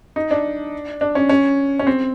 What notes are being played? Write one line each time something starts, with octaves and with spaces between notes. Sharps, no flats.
D#4
D4
D4
C#4
C#4
C#4
C4